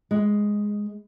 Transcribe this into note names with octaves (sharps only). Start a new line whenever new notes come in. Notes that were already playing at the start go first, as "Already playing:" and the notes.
G#3